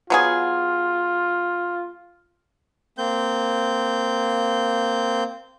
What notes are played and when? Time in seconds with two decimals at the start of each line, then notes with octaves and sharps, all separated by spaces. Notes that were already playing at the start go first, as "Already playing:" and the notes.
0.10 F#3 B3 F4 G#4
2.98 A#3 C4 G6